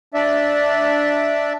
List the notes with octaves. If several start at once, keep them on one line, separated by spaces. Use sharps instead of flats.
D4 D5 E5